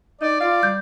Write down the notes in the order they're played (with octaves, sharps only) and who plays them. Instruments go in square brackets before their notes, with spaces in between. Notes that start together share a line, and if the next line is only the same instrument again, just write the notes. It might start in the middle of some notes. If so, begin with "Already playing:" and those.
[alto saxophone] D#4 [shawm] D5
[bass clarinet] F4 [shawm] D5 [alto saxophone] F5
[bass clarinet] G3 [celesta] G6